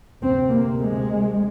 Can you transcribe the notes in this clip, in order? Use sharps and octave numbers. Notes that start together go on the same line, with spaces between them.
D2 C3 C4
A#3
G#3